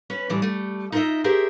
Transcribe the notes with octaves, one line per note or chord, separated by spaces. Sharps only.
C#4 B4 C#5
A2 D3 E3 G3 D4
G3 A3
D#4 F4 A#4 C#5 D#5 E5
G4 G#4 A#4 C5 E5